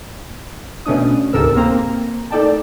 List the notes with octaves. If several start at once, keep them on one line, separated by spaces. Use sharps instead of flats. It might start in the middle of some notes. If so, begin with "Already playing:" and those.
B2 A3 C#4 D4 D#6
D2 G#2 C3 A4 A#4 E6
A#3 C4 A#5
A3 D#4 A4 D5 G5 A5